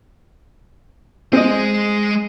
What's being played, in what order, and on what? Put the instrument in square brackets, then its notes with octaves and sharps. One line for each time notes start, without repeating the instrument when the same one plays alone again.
[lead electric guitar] G#3 G#4 [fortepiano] C4 D#5